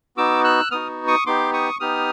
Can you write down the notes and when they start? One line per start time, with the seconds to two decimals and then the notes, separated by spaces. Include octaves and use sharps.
0.17 B3 D#4 F#4 D6 E6
0.44 E6 F#6
0.71 B3 D#4 F#4 D#6 F6
1.07 C#6 D#6
1.26 B3 D#4 G4 C6 D6
1.53 C#6 D#6
1.80 B3 D#4 G4 D#6 F6